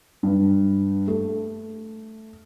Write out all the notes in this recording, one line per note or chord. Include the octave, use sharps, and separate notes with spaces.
G2
A3